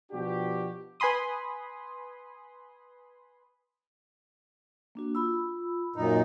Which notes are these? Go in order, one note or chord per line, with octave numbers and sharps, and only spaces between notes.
B2 F3 D4 F#4 G4
B4 G#5 B5 C6 D#6
A#3 D4 F#4
F4 B5 E6
F#2 A#2 D#4